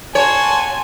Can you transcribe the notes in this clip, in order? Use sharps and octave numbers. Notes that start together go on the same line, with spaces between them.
F#4 C#5 G#5 A5 C6